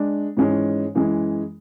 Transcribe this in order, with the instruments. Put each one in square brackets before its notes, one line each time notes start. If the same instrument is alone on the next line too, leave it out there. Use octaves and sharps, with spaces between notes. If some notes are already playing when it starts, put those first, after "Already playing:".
Already playing: [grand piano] G#3 D4
G#2 E3 G#3 C#4
F#2 E3 G#3